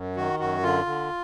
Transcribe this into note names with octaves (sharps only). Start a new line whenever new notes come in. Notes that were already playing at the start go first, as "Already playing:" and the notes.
Already playing: F#2
D#3 F#4
F#2 F#4
D3 F4
D3